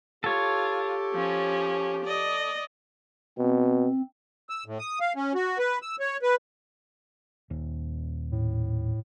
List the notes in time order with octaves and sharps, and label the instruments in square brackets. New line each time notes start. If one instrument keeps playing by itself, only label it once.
[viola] F4 [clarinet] G4 [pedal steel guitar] A4 C#5
[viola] F3 C#4
D5 D#5
[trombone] B2 [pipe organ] C4
[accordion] E6
A2
D#6
F5
C#4
F#4
B4
E6
C#5
B4
[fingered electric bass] D#1
[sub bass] A2